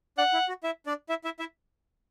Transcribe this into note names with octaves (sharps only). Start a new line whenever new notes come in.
D4 D5 F#5
E4
F#4
E4 E5
D4 D5
E4 E5
E4 E5
E4 E5